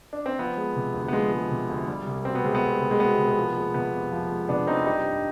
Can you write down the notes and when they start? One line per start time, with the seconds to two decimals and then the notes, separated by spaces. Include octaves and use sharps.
0.13 D4
0.26 C4
0.39 F3 B3
0.58 G#3
0.76 C3
0.94 D2
1.08 B3
1.13 F3 G#3
1.32 G#3
1.51 C3
1.70 D2
1.88 G3
2.06 C2
2.25 B2 C4
2.35 B3
2.44 C2 G#3
2.55 B3
2.62 G3
2.81 C2
2.91 G#3
3.00 B2 B3
3.19 C2
3.37 F3
3.56 G#3
3.74 C3 B3
3.93 F2
4.11 F3
4.31 G#3
4.49 C3 B3 D4
4.67 F2 C4 D#4
4.86 G3 D#4 G4
5.05 G2